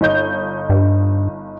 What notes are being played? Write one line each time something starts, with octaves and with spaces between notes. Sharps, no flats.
G1 D#4 G6
G2